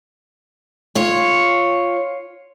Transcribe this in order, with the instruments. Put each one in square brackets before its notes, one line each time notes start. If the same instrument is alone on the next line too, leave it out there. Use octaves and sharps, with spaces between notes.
[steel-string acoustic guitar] F4 C#5